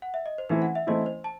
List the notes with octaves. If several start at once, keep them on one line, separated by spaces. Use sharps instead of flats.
F#5
E5
D#5
C5
E3 A3 C4 E4 B4
F#5
E5
E3 A3 C4 E4 D#5
C5
A5